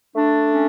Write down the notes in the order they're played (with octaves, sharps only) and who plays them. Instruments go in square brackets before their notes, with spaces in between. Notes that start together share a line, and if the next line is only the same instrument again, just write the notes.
[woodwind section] A3 D4
C#4